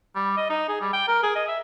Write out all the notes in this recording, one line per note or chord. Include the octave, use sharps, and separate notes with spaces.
G3
D#5
D#4
G#4
G3
G5
A#4
G#4
D#5
E5